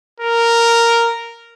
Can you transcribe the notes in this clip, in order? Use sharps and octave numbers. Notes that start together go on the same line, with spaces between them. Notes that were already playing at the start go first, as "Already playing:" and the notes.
A#4